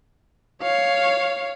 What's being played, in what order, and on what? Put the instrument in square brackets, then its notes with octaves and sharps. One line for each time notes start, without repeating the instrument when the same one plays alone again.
[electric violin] C#5 F5